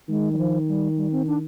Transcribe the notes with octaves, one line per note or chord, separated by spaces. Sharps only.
D#3 G#3
G3
F3
G3
G3
C4
D4